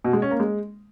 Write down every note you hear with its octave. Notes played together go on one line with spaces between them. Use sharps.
B2
G#3
C#4
A#3
G#3